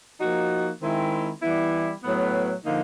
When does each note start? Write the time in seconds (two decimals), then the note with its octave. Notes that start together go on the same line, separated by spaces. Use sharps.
0.20 F3 A#3 D#4 F#4
0.81 D#3 G#3 C4 E4
1.42 E3 G3 B3 E4
2.03 A2 F#3 B3
2.63 D3 F3 A#3 D#4